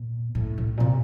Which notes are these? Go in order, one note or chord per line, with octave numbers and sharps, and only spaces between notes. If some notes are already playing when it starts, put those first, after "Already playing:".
Already playing: A#2
A2
A2
A#2
C3